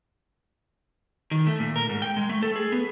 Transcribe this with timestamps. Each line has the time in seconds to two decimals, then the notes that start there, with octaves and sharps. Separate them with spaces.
1.31 D#3
1.47 A3
1.60 A#2
1.76 A#4
1.89 G#2
2.02 G5
2.17 G#3
2.30 A3
2.43 A4
2.56 G#4
2.72 B3